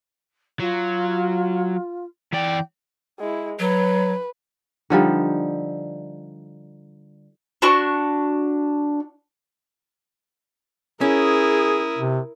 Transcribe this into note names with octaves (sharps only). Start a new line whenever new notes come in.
F#3 F4
E3 D5 G5
G#3 E4
F#3 B4
D3 F3 G3 D#4
D4 F#4 C#6
C#4 E4 G#4 A#4 D#6
C3